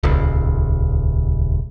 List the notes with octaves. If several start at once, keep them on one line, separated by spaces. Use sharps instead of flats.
D#1 C#2